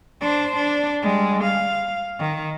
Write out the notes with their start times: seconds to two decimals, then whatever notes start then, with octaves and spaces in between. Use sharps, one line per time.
0.21 D4 C5
0.57 D4
1.03 G3 G#3
1.44 F5
2.19 D#3